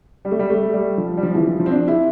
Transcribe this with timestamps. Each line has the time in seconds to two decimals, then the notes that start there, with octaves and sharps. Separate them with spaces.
0.25 G3
0.31 A3
0.39 G3
0.50 A3
0.74 G3
0.98 F3
1.17 G3
1.23 F3
1.35 E3
1.47 F3
1.60 F3
1.66 C4
1.71 D4
1.88 E4